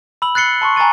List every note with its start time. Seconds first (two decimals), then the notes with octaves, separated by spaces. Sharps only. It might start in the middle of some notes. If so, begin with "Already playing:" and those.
0.22 B5 E6 F#7
0.35 F#6 A6 C7 C#7 G7
0.61 A5 C6 C#6
0.76 G#5 A#5 C#6 A6 D#7